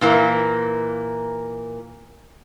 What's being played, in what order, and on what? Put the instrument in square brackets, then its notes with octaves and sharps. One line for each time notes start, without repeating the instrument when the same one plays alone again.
[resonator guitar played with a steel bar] A#2 E3 A#3